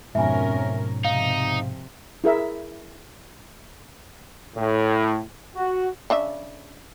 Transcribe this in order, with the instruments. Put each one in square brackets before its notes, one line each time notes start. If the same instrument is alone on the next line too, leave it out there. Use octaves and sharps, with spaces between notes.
[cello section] F2 C#4 A#4 [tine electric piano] G#2 B2 [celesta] E5 G#5
[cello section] C3 F3 [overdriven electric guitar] D#4 [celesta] F5
[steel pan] E4 G#4 A#4 E5
[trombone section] A2
F#4
[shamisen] C#3 D4 E5